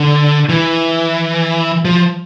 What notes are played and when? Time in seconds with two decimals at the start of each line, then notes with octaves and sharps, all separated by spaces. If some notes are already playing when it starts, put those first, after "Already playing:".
Already playing: D3
0.49 E3
1.85 F3